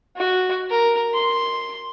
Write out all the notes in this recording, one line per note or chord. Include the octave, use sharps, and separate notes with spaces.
F#4
A#4
C6